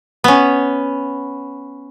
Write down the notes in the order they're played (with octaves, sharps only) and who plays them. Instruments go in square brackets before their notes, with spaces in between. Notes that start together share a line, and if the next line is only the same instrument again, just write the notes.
[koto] B3 C#4